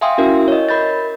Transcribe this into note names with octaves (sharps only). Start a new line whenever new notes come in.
E5 F5 G5 G#5 C6 D#6
C#4 E4 F#4 A#4 E5
C#5 D#5
A#4 B5 G6 A6